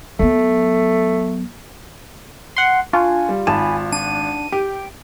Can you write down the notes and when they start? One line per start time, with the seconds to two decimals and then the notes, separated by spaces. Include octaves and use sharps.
0.19 F#3 A3 B3
2.56 F#5 C6
2.93 D4 F4 G#5 C#6 F#6
3.29 G3
3.47 G#1 G#5 A5 B5 E7
3.92 D4 F#5 D#7
4.52 G4 G5